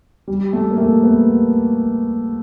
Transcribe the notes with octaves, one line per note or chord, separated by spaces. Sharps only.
G3
A3
A#3
A3
B3